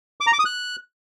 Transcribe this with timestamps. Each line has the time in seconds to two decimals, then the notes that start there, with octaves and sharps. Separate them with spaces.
0.21 D6
0.27 A#5
0.33 D6
0.39 D#6
0.45 F#6